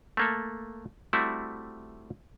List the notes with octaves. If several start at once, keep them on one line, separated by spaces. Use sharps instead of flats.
A3 A#3 A4
G3 A3 C4 E4 F#4